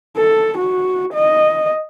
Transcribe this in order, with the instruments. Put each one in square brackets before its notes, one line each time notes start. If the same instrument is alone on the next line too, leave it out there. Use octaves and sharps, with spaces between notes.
[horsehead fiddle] A4
F#4
D#5